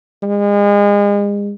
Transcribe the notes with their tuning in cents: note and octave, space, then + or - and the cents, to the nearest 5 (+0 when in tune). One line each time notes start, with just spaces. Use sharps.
G#3 -35